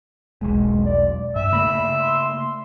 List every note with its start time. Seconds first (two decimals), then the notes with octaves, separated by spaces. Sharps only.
0.41 E1 B1 G#3
0.86 D5
1.36 G2 E5
1.52 C#3 A3 A#3 B5
2.00 C6